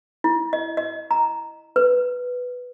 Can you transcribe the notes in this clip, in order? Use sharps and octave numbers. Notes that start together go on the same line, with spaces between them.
E4
D#5
D#5
A#5
B4